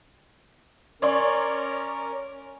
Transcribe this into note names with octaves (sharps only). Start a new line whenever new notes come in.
C#4 A#4 C#5 D5 C6